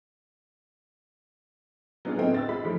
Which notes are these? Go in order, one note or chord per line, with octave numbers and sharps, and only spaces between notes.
F#3 B3 D4 F4 G#4
A2 D3 A3 B3 C4 D#4
E6 A6
G#3 F4 B5 B6
G#2 F3 A3